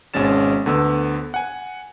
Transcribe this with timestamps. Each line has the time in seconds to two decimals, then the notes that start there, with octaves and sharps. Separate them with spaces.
0.14 G#1 B2 G#3 C#4 A6 E7
0.66 D2 D3 B3 E6
1.34 F#5 G#5